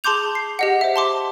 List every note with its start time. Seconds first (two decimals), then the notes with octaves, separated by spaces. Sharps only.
0.04 G#4 A5 C6 D6 G6 F7
0.35 C7
0.59 G4 D#5 F#5
0.81 C5 E5
0.96 A5 C6 D6